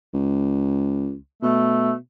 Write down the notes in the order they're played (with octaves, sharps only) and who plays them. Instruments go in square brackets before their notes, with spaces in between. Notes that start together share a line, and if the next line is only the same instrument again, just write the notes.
[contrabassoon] C#2
[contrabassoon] B2 [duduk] A3